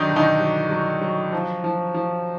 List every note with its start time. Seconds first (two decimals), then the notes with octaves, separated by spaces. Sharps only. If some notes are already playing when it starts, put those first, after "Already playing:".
Already playing: D3 D#3 F#3 D4 D#4
0.09 B2
0.16 D#3 D#4
0.40 F#3
0.70 F#3
1.01 F#3
1.32 F3
1.64 F3
1.94 F3